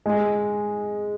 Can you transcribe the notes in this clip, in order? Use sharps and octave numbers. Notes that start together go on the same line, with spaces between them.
G#3